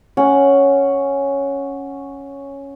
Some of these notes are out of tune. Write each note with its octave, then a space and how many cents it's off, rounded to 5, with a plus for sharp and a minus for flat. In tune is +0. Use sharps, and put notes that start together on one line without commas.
C#4 +0 F#5 +0